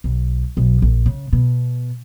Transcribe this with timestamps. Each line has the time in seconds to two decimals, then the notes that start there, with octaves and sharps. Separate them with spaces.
0.04 B1
0.57 B1
0.82 A#1
1.06 C#3
1.33 B2